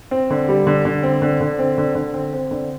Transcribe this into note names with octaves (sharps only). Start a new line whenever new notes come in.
C4
D3
G3
D3
D3
C4
D3
D3
C4
D3
D3
C4
C4
D3